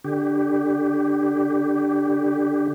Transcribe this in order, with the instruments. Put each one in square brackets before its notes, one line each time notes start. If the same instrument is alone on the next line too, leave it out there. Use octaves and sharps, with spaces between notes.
[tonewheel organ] D3 G4